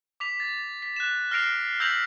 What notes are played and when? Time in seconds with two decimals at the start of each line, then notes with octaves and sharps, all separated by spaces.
0.20 D6 B6 F7
0.40 A6
0.82 B6
0.96 F#6 E7
1.31 F6 A#6 C7 D7 F7
1.80 E6 G6 A#6 B6 F7 F#7